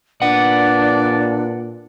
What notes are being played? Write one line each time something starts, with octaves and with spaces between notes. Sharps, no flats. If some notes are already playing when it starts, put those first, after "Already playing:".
A#2 D4 B4 D5 F#5